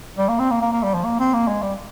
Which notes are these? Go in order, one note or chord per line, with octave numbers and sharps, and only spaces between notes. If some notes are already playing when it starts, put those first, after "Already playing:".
G3
A#3
C4
A#3
A#3
A#3
G3
F3
A#3
C4
A#3
G#3
G3